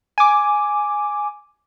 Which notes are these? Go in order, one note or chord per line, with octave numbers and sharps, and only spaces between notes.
G#5 D6